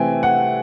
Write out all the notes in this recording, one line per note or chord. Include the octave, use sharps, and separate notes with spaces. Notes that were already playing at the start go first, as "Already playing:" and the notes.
Already playing: C3 E3 A3 C4 G5 G#5
F#5